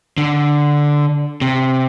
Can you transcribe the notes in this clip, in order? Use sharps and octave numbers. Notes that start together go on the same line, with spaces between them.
D3
C3